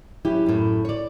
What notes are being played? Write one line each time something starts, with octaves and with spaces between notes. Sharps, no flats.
F#3 C#4 E4 G4
F#2 A2
C#5 D5